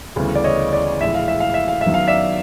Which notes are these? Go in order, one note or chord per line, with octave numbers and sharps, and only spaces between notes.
D2 C#3 E3 G3 B3
D5
C#5 D#5
D5
A#1 A2 E3 G#3 E5
F5
E5
F5
E5
F5
E5
F#2 D#3 F#3 B3
F5
D5 E5